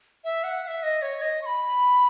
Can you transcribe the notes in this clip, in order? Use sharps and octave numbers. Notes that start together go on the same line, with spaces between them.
E5
F#5
F#5
E5
D#5
C#5
D#5
C#6
B5